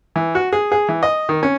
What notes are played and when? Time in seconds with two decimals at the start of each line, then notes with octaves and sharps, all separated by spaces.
0.16 E3
0.35 F#4
0.53 G#4
0.72 G#4
0.89 E3
1.03 D#5
1.29 D#3
1.43 C#4